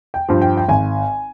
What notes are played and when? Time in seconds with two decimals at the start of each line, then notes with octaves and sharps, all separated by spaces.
0.14 G5
0.28 G2 F3
0.42 G5
0.57 G5
0.68 G#1 G#5